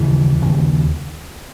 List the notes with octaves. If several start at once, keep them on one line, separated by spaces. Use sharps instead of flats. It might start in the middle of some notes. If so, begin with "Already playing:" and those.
Already playing: D#2 C#3 E3
D#2 C#3